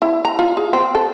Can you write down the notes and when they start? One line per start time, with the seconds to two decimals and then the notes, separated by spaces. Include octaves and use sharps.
0.02 E4
0.25 A#5
0.39 F4
0.57 G#4
0.73 C4
0.95 A4